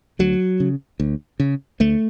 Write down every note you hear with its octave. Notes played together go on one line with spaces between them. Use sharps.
D2 F#3
C#3
D2
C#3
D2 A3